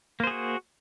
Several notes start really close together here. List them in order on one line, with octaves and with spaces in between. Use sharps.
A#3 C5 G#4 F#4